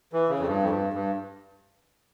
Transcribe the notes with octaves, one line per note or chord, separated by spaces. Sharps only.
E3
C#3
F2
G2
F2
G2
G2